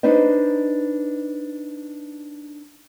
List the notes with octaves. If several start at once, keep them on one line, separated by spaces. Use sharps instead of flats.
D4 D#4 B4 C5 D#5